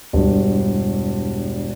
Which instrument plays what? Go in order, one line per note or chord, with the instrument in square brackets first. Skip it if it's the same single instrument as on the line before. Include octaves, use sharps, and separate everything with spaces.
[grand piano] E1 G2